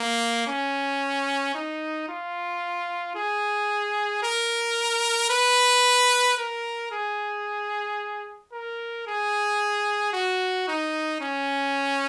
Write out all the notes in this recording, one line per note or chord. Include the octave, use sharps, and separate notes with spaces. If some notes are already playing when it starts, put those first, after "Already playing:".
Already playing: A#3
C#4
D#4
F4
G#4
A#4
B4
A#4
G#4
A#4
G#4
F#4
D#4
C#4